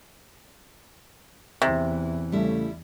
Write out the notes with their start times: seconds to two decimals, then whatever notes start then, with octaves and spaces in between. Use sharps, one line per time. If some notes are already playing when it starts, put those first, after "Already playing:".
1.62 E2 C3 E3
2.32 C#3 G3 A3 E4